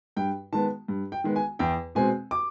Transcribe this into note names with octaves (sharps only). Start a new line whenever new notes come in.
G2 G5
D#3 G#3 B3 A5
G2
G5
D#3 G#3 B3
G#5
E2 G5
B2 G#3 C4 G#5
D6